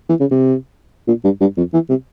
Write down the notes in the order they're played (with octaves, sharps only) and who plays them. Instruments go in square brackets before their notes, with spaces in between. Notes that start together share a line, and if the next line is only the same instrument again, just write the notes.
[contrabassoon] E3
C#3
C3
A#2
G2
G2
F2
E3
C3